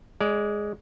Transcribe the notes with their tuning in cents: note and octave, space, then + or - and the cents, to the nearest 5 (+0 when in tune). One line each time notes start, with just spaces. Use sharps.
G#3 +0 D5 -15